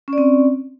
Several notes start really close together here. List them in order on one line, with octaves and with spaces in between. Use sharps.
C#4 D5 C4